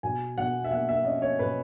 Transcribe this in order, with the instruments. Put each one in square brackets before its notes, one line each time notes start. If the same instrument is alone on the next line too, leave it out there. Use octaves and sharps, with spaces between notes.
[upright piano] B2 G#5
B2 F#5
E5
A#3 F#5
E5
C#4 D#5
C#5
B2 B4